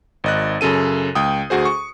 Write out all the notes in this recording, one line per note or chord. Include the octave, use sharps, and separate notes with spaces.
G#1 D#5 F#6
F#2 C#3 A4 D#7
C#2 G5 D#6
D2 F#4 G#4 C5
C#6